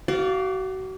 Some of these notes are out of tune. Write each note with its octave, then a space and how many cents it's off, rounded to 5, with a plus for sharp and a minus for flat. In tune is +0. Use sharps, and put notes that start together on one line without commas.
F#4 +35 D5 -5 F5 +0